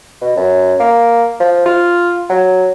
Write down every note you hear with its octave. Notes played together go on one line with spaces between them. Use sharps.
B2
F#2
A#3
F3
F4
F#3